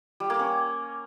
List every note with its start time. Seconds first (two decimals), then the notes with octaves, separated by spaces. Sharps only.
0.20 G3
0.30 A#3
0.39 C#4